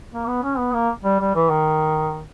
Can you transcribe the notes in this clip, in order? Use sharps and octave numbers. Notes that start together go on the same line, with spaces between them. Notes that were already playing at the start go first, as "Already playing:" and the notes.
A#3
B3
C#4
B3
A#3
G3
G3
E3
D#3